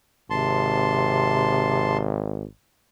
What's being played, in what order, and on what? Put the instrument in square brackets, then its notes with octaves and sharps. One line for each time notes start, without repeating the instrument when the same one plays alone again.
[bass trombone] G#1 [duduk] C3 [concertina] A5 C6